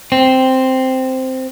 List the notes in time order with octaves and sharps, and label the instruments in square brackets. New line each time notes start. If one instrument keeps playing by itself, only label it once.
[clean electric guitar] C4